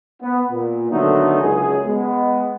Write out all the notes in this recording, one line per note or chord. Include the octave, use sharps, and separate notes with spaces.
B3
A#2
D3 D#3 F#3 A3 B3 D#4
C#2 F#2 G#4
G#3 B3